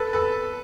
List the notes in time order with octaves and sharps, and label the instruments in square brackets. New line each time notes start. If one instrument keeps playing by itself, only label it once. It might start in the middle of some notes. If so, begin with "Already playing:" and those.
Already playing: [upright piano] A4 B4
A4 B4